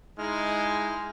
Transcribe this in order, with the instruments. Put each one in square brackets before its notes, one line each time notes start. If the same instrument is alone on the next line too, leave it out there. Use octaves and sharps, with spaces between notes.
[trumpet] G#3 [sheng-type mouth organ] D#4 E4 F6